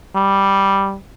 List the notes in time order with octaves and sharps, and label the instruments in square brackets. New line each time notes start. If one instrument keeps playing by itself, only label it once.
[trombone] G3